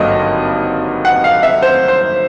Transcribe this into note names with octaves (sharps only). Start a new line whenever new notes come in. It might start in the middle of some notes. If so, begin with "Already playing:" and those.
Already playing: G#1 G2 D3 F#3 A#3 D#5
F#5
F5
E5
C5
C5